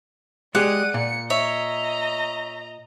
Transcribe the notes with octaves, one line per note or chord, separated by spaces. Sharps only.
G#3 G4 G#4 D5 F#5 D#7
A#2 C#7
C#5 D#5 E5 A#5